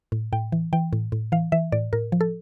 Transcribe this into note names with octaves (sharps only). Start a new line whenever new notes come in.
A2
A2 G5
E3
E3 G5
A2
A2
E3 F5
E3 E5
A2 D5
A2 A#4
F3
A4